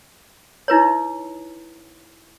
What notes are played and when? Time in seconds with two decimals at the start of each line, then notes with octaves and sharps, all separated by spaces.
0.68 D#4 E4 B4 C#5